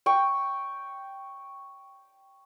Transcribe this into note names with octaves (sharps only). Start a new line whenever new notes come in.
G5 C#6